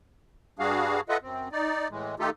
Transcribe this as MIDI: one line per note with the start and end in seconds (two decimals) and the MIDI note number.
0.59 1.01 43
0.59 1.01 55
0.59 1.01 62
0.59 1.01 66
0.59 1.01 68
0.59 1.01 77
1.09 1.17 65
1.09 1.17 69
1.09 1.17 71
1.09 1.17 75
1.09 1.17 76
1.09 1.17 78
1.22 1.49 42
1.22 1.49 60
1.52 1.88 63
1.52 1.88 74
1.90 2.15 45
1.90 2.15 52
1.90 2.15 56
2.19 2.30 51
2.19 2.30 57
2.19 2.30 63
2.19 2.30 65
2.19 2.30 67
2.19 2.30 69